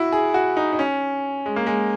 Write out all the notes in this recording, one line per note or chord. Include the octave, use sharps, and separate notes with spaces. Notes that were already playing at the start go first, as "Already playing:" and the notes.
Already playing: E4 F#4
G#4
F#4
D#4
D#4
C#4
G#3
A#3
G#3